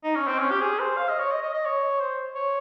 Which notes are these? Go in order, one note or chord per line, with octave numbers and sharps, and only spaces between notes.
D#4
C#4
C4
C#4
G4
G#4
C5
F5
D#5
C#5
D#5
D#5
D#5
C#5
C5
C#5